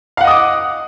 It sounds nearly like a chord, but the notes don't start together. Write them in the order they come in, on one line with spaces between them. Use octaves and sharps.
F5 F#5 D#5 D#6 D6